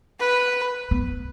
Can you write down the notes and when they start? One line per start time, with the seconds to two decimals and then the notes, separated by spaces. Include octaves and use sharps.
0.19 B4
0.91 B3